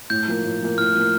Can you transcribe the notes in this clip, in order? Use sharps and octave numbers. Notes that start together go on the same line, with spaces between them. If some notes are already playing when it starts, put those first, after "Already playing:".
A2 G6
F3 A#3
A2
F3 A#3
A2 F6
F3 A#3